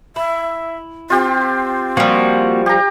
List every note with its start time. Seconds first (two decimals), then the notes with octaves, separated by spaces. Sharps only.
0.16 E4 E5
1.10 C4 F4 G4
1.97 F3 G3 A#3 F#4
2.66 G4 A#5